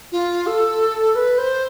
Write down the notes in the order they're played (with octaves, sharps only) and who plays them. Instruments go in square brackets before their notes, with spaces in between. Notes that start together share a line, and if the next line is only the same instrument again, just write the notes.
[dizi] F4
A4
B4
C5